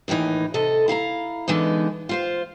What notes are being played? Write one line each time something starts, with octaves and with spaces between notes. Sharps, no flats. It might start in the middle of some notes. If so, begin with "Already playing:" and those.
D#2 A2 D#3 E3 D#4
C3 A4 D#5
E4 F5 F#5 A#5
D3 E3 G#3 B3 D#4
F4 C5 F5